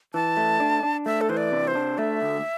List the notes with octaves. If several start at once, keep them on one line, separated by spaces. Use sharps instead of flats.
E3 A5
A3
D4
D4
A3 E5
A4
E3 C5
D5
C3
C5
D4
A3 E5
D2